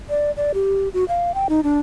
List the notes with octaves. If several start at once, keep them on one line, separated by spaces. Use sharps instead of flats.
D5
D5
G4
F#4
F5
G5
D#4
D4